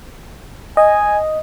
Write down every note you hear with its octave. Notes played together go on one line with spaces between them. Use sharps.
D#5 G#5